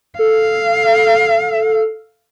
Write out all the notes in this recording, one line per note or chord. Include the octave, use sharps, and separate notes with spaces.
A4 F5